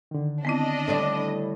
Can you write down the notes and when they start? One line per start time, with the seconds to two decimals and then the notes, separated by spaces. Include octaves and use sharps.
0.11 D3 D#3
0.45 B3 C4 D4 E4 D#5
0.88 A2 G3 D5